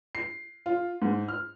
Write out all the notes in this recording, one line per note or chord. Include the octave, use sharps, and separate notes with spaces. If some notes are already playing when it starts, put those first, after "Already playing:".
C7
F4
G#2
F6